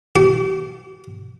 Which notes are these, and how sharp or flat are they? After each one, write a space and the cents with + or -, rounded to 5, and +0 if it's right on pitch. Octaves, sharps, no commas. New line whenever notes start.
G4 -40